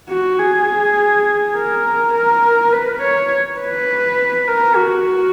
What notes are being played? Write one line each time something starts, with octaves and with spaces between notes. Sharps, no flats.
F#4
G#4
A#4
A#4
B4
C#5
B4
A#4
F#4